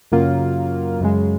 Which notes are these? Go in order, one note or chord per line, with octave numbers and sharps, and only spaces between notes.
F#2 C#3 F#3 A#3 F4
F#2 C#3 G#3